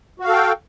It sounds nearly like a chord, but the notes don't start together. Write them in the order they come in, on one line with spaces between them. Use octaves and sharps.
F#4 F5 A4 G5